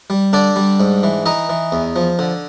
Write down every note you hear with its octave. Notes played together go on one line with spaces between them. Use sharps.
G3
D3 D4 D5
G3
G#2
E3
E3 D#4 D#5
E3
E2
F3
D3